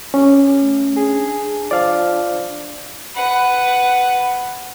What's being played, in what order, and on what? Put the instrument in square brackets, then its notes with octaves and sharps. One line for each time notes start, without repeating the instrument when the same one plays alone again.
[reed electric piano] C#4 [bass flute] G4
[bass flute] A3
[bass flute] D4 [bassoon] G#4
[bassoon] F3 [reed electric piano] D5 F5
[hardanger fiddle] B4 F#5